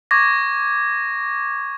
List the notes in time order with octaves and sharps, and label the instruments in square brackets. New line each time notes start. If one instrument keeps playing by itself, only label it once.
[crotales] C#6 D6 G#6 A#6